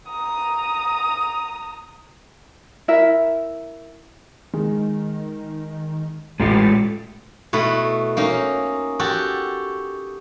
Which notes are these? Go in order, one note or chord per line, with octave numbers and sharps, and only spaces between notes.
A#5 D#6
E4 A#4 E5
D#3 G#3
A1 G#3 F4 A4 A6
B2 A3 E4 B4
A#3 C#4 D#4
F#4 G4 A4